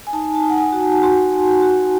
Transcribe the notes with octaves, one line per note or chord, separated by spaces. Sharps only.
G#5
D#4 A5
A5
D#4
F#5
G#5
F#4
G#5
F#4 C6
F#4
F#4